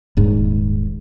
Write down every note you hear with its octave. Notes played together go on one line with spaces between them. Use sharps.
D#1 G#2